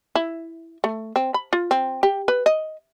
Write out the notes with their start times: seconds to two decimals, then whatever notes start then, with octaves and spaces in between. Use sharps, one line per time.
0.15 E4
0.84 A3
1.16 C4
1.34 B5
1.53 F4
1.71 C4
2.03 G4
2.28 B4
2.46 D#5